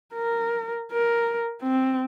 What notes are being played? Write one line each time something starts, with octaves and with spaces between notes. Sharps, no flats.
A#4
A#4
C4